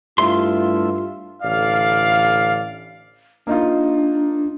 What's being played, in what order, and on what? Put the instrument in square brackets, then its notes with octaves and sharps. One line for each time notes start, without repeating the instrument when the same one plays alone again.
[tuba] G2 [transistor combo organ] A3 E4 E5 [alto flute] F4 [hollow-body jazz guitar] C6
[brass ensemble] A1 D3 D5 F5
[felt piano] A#3 D#4 F4 [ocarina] D4